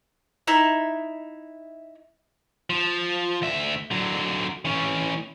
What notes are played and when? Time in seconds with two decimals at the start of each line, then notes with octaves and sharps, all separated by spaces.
0.47 D#4 E4 E5
2.70 F3
3.42 D2 E5
3.91 D3 F#3
4.65 E3 C#4